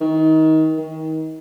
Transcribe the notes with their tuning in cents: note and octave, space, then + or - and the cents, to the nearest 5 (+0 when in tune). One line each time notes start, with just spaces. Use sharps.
D#3 +25
D#3 +30